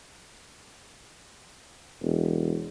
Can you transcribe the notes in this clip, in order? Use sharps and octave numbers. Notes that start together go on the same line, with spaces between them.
E1